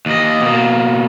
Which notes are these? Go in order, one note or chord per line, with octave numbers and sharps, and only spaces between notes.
D#2 D#5
B2 A#3